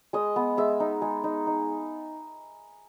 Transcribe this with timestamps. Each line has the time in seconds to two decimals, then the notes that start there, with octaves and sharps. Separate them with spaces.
0.13 G#3 D#5
0.36 B3
0.57 G#3 E5
0.80 D#4
1.02 G#3
1.24 D#4
1.47 D#4